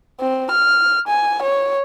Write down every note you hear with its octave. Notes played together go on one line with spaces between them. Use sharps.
C4
F6
G#5
C#5